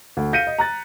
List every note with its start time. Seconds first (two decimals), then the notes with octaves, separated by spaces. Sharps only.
0.17 D2
0.33 F5 G6 A#6 B6 C#7 D#7
0.47 D#5
0.58 A#5 F#6 A6